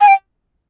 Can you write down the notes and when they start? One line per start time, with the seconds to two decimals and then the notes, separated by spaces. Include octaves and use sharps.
0.01 G#5
0.08 G5